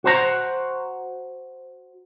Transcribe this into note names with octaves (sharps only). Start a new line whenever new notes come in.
F#4 C5 A#5